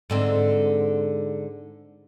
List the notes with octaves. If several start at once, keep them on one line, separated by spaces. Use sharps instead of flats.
G#2 D3 C4